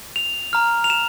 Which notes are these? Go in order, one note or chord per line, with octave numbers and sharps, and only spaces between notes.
F7
A#5 F6
F7
E7